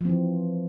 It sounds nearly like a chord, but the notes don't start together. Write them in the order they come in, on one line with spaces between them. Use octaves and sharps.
F3 C4 E3